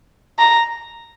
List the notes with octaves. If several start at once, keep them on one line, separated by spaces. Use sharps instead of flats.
A#5